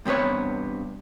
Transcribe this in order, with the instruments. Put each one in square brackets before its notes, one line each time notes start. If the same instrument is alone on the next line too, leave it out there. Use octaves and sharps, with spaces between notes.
[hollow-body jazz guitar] G2 C3 B3 B4 C#5